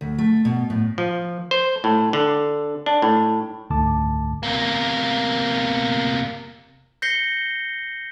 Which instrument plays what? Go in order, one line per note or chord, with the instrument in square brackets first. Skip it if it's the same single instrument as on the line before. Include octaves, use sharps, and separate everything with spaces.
[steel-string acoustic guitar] D2
A3
B2
A2
[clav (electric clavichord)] F3
C5
A2
D3
D4
A2
[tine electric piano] C#2 G#2 D3 A3 A5 D6
[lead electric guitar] C3 A#3
[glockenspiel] G6 A#6 C7 C#7 G7